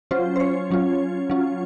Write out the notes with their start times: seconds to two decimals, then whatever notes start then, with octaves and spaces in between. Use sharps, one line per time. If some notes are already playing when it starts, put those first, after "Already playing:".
0.11 F#3 C#4 F4 C5
0.36 C5
0.40 C#5
0.71 F#3 C#4 F4
1.30 F#3 C#4 F4